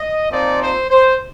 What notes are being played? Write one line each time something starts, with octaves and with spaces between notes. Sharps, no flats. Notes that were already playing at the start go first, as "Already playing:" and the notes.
Already playing: D#5
A#2 F3 C4 D#4 D5
C5
C5